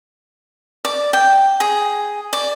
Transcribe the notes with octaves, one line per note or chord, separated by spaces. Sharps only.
D5
G5
G#4
D5